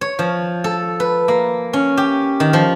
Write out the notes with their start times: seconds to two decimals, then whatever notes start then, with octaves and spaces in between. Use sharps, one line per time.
0.01 C#5
0.19 F3
0.64 A4
1.00 B4
1.28 A#3
1.73 C#4
1.97 G4
2.40 D#3
2.53 F3